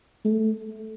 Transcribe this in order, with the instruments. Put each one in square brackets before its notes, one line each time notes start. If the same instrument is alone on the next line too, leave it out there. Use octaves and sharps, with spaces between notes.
[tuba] A3